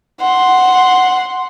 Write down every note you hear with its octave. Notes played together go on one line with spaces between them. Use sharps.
F#5 C6